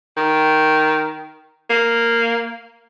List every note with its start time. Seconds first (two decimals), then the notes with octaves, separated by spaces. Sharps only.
0.17 D#3
1.70 A#3